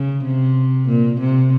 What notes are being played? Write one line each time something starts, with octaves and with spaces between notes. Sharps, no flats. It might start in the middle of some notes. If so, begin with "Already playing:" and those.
Already playing: C#3
C3
A#2
C3